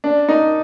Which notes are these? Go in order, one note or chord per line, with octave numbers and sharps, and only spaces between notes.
D4
D#4